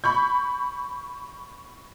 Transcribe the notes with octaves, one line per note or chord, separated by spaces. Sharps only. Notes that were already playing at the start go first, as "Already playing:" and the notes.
B5 C#6 G6